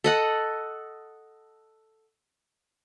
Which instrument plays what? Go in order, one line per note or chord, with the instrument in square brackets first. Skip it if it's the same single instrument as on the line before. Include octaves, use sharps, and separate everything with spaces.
[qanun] A4 D#5 F#5